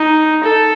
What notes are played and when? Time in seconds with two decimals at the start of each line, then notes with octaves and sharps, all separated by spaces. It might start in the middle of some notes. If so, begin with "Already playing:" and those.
Already playing: D#4
0.43 A4